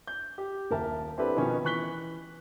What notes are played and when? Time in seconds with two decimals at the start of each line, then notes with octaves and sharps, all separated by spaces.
0.07 G6
0.38 G4
0.71 D#1 A#4 E5 A5
1.18 C4 D4 E4 G4 A4 B4
1.37 B2 D#3 F3 B3 C#4 A#4
1.64 E3 C#6 F#6 B6 G7